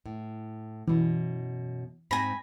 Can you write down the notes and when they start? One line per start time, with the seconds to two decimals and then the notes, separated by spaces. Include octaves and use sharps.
0.06 A2
0.87 F#2 B2 E3
2.11 G#2 C4 G#5 B5 A#6